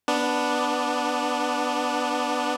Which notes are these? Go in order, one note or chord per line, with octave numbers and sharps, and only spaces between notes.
B3 D4